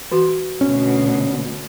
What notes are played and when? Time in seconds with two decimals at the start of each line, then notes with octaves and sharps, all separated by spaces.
0.12 E3 F#4 C6
0.61 D2 B2 C#4